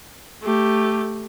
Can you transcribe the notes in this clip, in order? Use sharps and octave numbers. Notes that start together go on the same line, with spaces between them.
A3 G4